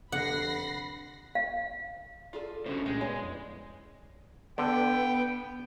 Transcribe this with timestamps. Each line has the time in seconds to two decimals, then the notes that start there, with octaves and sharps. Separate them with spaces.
0.12 F1 D3 F#5 B5 A#6 C7
1.35 F5
2.33 F4 G#4 A4 D5
2.66 C2 A2 D3 C#4 F#4 C5
2.86 A#2 G#3 G4
3.01 B3 E4 C#5 D5 G#5
3.22 F2
4.58 D3 B3 G5